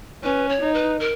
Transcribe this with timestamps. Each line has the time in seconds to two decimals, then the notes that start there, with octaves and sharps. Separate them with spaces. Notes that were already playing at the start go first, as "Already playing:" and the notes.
0.24 C#4 B4
0.49 C#5
0.61 D#4
0.74 B4
1.00 A#4